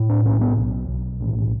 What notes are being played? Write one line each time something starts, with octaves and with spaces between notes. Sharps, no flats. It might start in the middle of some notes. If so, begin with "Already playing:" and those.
Already playing: A2
D4
B1 C#4
B3
B1
B1
A1